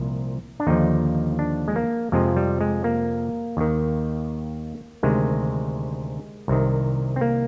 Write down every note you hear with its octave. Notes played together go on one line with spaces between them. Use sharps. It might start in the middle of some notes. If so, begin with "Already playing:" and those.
Already playing: C2 A#2 F3
D4
D#2 D3 F3 D#4
D4
G#3
A#3
F2 C3 F3 G#3
G3
G#3
A#3
D#2 D#3
D2 C3 D#3 G#3
C2 C3 D#3
C4
A#3